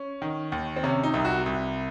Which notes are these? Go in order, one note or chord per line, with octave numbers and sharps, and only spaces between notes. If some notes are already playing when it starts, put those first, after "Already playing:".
Already playing: C#4
D#3
D#2
C4
C3 C#4
D#4
C2
F#4
C2